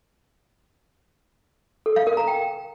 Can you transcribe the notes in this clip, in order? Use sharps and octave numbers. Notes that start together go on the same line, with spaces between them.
A4
F5
A#4
A#5
G5